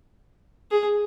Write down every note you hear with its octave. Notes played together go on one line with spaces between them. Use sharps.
G#4